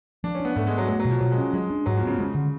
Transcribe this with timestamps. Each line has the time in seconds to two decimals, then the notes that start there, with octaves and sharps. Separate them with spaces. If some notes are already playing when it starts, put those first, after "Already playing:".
0.24 F3 D4
0.35 C#4
0.40 B3 D4
0.56 G#2 A3
0.67 G#3
0.72 B3
0.78 F#3
0.89 F#3 A3
1.00 F#3
1.05 B2
1.11 F3
1.20 B2 F#3
1.32 G#3
1.38 C#4
1.53 F#3 G#3
1.70 D4
1.86 G#2 F#3
1.97 F3 B3
2.07 C#3
2.18 C#3 G#3
2.35 D3